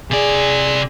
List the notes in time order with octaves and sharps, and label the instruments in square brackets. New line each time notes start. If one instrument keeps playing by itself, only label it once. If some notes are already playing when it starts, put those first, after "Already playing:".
[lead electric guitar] C3 D5 [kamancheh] G#4